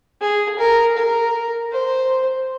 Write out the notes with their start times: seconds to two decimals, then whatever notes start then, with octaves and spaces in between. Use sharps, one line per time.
0.21 G#4
0.59 A#4
0.97 A#4
1.72 C5